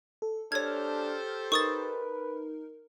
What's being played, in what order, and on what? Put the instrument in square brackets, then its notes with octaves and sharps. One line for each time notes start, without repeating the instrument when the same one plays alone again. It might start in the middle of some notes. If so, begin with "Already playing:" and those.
[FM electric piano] A4
[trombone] D4 [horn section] G4 A4 C5 [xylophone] C#5 G#6 [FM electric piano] F6
[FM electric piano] D#4 A#4 [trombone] B4 [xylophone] C#6 D#6 A6